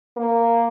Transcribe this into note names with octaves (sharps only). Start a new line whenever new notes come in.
A#3